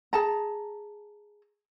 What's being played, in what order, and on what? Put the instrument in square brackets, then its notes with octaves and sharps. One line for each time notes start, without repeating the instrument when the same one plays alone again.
[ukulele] G#4 A5 A#5